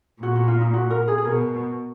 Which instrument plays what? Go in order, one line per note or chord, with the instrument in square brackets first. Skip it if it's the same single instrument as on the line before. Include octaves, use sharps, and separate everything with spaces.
[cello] A#2 [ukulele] F#4
[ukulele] F#4
F4
D#4
F#4
A#4
G#4
G#4
[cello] B2 [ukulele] A#4